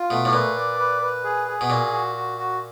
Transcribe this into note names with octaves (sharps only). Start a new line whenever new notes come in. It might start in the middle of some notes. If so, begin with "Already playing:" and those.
Already playing: F4
B2 A3
A2
A#2 B4
D5
B4
B4
G#4
G#4
B2
A#2 F#4
F#4
F#4
F#4